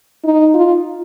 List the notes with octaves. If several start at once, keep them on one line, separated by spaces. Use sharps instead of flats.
D#4
F4